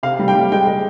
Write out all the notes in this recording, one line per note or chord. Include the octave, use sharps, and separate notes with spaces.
C3 F5
G3
G5
G3
G#3 G5
G#3